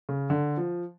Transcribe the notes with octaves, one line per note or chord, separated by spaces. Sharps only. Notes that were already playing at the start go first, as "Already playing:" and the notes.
C#3
D3
F3